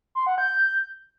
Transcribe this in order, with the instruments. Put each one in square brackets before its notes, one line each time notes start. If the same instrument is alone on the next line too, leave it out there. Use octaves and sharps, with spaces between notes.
[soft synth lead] C6
F#5
G6